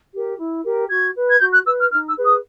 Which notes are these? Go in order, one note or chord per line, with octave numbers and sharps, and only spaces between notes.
G4 A#4
E4
G4 A#4
F#4 G#6
B4
G#6
F#4 G6
F#6
B4 E6
F6
D#4 F6
E6
G#4 B4
D#6